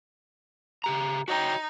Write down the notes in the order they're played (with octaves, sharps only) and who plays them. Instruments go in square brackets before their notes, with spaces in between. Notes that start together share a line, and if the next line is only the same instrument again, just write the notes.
[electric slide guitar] C#3 G4 A#5
[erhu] D#4 [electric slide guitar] F#4 C#5 G5